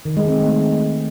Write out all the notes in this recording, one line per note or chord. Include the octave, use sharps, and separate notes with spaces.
D#3
G#3
C4
A3